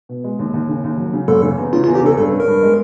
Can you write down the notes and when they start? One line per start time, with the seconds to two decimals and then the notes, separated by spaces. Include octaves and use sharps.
0.09 B2
0.24 G#3
0.39 D#2
0.54 D#2
0.69 C#3
0.84 D#2
0.98 F#3
1.13 C#3
1.28 F#1 A4
1.43 C#3
1.58 E2
1.73 C#3 F4
1.84 F4
1.88 E2
1.95 G4
2.03 C#3 A4
2.17 G2 A4
2.32 C#4
2.40 A#4
2.48 G2
2.63 G#3